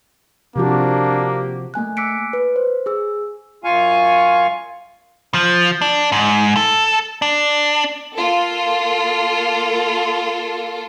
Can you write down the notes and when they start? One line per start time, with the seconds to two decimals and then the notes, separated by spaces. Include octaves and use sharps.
0.56 C3 F3 A#3 D4 F#4 G4
1.74 A3 A#3 G#5 F#6
1.97 D6 E6 F#6 B6 C#7 D7
2.33 B4
2.56 C5
2.86 G#4 E6
3.64 F#2 F4 F5 G#5 C#6
5.34 F3
5.81 D4
6.12 G#2
6.56 A4
7.22 D4
8.15 A#3 F4 A4